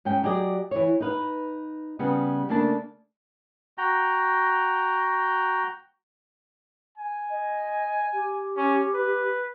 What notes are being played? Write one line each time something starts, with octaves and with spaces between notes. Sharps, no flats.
G#2 C#4 G5
F#3 G4 G#4 D5 D#5
E3 C#5
D#4 B4 F5
C#3 G3 B3
C#3 A3 A#3 D4 A5
F#4 G5 A#5
G#5
D#5
G4
C#4
B4